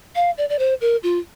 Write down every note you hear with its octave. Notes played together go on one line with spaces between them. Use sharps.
F5
D5
D5
C5
A#4
F4